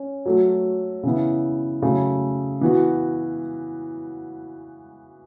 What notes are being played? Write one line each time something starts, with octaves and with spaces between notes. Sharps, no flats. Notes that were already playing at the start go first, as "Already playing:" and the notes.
Already playing: C#4
F#3 A3 F#4
C#3 E3 B3 E4
C#3 F#3 A3
E3 B3 F#4